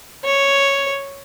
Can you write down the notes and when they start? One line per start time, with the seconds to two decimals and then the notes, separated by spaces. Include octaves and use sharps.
0.24 C#5